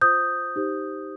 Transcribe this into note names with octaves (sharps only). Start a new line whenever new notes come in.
F4 C5 D#6 G6
D#4 G4 C5